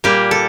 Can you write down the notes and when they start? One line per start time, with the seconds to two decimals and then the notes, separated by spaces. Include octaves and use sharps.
0.04 A#2 G3 A#3 G4
0.31 A4